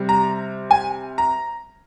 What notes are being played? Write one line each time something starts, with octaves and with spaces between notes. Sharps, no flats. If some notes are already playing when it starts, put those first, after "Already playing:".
Already playing: C3 G3
A#5
G#5
A#5